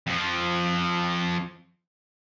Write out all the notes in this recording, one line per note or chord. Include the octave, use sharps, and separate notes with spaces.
F2 F3